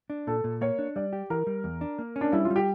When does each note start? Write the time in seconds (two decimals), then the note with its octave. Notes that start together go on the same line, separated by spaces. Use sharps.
0.10 D4
0.27 A#2 A4
0.44 A#2
0.61 A#3 C#5
0.79 D4
0.96 G3 D5
1.13 G4
1.30 E3 A#4
1.47 G3
1.64 E2
1.81 D4
1.99 A#3
2.16 C#4
2.21 D4
2.32 G3 E4
2.45 F4
2.50 G3
2.56 G4